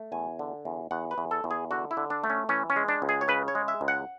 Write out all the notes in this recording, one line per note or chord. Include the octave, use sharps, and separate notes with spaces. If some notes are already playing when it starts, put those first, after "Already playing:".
Already playing: A3
E2 G#5
D3
E2
E2 F#5
B4
E2
A4
E2
G#4
D3 F#4
E4
D3
D4
A3
C#4
E3 C#4
C#4
G#3
D4
C#2
G#4
C#5
C#3 B4
C#5
G#3
E5
C#2
F#5